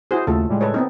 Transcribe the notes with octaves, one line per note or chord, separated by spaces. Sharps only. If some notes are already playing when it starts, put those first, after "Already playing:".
E4 F#4 G#4 C5
D#2 C#3 A3 F4 A4
A2 G3 G#3
A4 B4 C#5
B3 C4 D#4